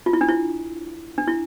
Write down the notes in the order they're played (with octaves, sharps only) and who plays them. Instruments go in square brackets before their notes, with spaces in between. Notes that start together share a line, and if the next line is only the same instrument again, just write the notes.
[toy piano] F4
E4
D4
E4
D4
E4